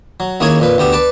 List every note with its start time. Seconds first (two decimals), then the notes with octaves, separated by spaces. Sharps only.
0.20 F#3
0.40 D#2 A#3 C#4 E4 G#4 G#5
0.60 F2 A#2 B4
0.78 D2 B3 G4 E5
0.92 B4 D5 A5 D6